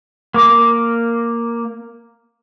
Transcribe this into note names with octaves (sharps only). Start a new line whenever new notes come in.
A#3 D6